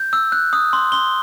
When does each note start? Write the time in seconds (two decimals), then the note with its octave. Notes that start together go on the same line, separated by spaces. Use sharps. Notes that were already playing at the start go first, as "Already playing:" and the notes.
Already playing: G6
0.13 E6
0.32 F#6
0.53 D#6
0.73 C6
0.92 C6 G7